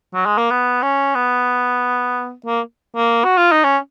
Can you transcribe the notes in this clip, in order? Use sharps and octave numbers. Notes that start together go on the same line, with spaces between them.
F#3
G#3
A#3
B3
C#4
B3
A#3
A#3
F#4
F4
D#4
C#4